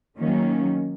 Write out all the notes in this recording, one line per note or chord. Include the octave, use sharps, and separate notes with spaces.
D#3 F#3 A#3 C#4